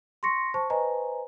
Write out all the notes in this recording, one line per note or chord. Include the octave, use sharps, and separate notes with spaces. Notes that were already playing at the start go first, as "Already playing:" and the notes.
C6 C#6 A#6 C#7
C5 A5 C#6
B4 C5 D#5 G#5 A#5